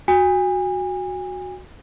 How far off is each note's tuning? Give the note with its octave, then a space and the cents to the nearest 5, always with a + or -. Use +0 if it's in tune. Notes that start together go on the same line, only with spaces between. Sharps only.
F#4 -10 G#5 -35